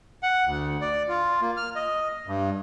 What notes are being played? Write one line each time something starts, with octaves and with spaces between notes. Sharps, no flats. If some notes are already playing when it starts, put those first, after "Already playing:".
F#5
D2
D5
F4
A#3
F6
D#5
G2